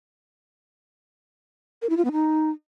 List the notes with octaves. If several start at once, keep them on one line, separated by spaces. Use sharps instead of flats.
A#4
E4
F4
B3
D#4